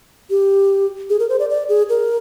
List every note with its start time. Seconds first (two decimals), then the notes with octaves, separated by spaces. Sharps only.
0.30 G4
1.10 G#4
1.19 A#4
1.29 C5
1.39 D5
1.50 D5
1.69 G#4
1.89 A#4